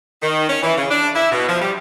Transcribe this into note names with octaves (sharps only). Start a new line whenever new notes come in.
D#3
C#4
E3
C#3
D4
E4
B2
F3
G3